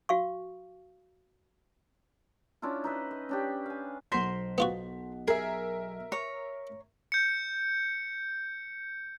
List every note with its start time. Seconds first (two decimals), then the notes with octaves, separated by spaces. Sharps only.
0.09 F#4 F5 C#6
2.62 C#4 D4 E4 F4
2.84 D#4 B4 E5
3.11 D#5
3.29 C#4 D4 G4
3.66 F5 G#5
4.12 B1 A#4 C5 F#5 C6 B6
4.58 B3 F4 F#4
5.28 G#4 A#4 E5
6.12 C#5 A#5
7.12 G6 C#7